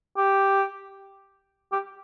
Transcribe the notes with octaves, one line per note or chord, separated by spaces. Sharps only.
G4
G4